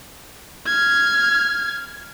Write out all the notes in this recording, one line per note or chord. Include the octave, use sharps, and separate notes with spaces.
F6 G#6